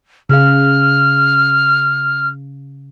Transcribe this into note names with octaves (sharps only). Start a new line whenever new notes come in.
C#3 G#4 F5 F6